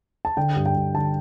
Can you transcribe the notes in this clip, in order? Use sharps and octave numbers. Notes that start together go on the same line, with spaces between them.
A5
D3 G5
G2
G5
G2
D3 A5